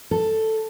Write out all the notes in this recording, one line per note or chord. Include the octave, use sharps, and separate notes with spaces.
A4